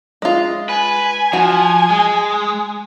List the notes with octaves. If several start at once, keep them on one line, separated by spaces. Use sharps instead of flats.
G#3 F4
B4 G#5
F3 F#4
G#3